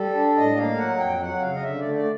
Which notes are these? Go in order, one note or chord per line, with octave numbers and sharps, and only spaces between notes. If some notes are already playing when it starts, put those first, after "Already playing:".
Already playing: G3 A4
D4
A2 D#5
A#3 F5
F#3 F#5
F2 G5
F#3 F#5
C#3 F5
D#5
D3 E5
A3 D5
D5